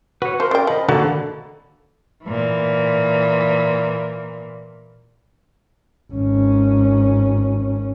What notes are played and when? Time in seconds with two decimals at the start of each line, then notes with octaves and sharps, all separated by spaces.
0.22 F#4 B4 C#5
0.40 F3 A#4 C5 C6
0.51 C#3 A#4 D5 G5
0.67 F3 D#5 B5
0.89 D3 D#3 A#3 F#4 A4
2.25 A#2 E3
6.13 G#1 C#4